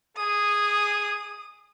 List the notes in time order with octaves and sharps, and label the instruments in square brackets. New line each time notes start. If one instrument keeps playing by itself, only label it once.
[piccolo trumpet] G#4 [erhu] D#6